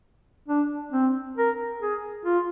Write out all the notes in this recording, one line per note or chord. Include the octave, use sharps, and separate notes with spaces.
D4
C4
A#4
G#4
F4